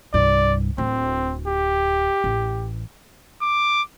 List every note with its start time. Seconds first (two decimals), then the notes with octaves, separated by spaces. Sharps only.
0.14 C2 G2 D5
0.78 D1 C4
1.47 G4
2.24 A1
3.42 D6